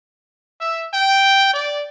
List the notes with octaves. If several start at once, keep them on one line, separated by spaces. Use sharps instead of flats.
E5
G5
D5